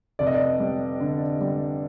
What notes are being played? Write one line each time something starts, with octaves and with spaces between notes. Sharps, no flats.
F1 D5
D#5
D5
G3
D3
G3